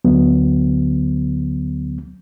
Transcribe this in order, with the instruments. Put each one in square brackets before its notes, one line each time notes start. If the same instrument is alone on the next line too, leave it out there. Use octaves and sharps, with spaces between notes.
[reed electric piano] D2 D3 F#3 B3